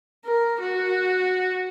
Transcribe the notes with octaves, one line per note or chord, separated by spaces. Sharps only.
A#4
F#4